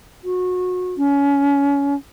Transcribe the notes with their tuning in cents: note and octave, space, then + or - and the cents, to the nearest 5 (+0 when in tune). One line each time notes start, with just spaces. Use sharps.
F#4 -25
C#4 +25